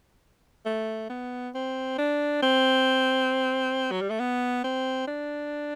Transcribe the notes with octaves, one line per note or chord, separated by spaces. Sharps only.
A3
B3
C4
D4
C4
F#3
G3
A3
B3
C4
D4